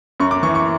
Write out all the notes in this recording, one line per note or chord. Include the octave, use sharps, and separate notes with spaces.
F#2 C#6
D6
E3 C#6
C#6